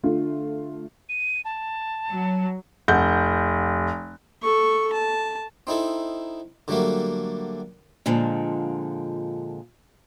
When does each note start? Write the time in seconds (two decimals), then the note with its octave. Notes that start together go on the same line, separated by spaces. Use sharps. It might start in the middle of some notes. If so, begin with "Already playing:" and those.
0.03 D3 A3 F4
1.09 D#7
1.45 A5
2.09 F#3
2.88 F1 F#5 G6
4.42 A4 C#6
4.93 A5
5.67 C4 D#4 E4 A4
6.68 D3 F#3 G3 A3 A#3
8.06 A#2 D3 F3 G#3